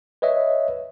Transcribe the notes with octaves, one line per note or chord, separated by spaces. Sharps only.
B4 C#5 D#5 E5